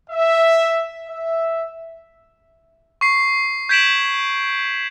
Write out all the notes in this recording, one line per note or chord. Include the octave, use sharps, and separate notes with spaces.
E5
E5
C#6 C7
G6 G#6 B6 D7 E7 F#7